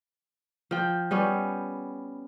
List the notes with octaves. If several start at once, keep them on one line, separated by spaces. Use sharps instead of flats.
F3 G5
G3 B3 C#4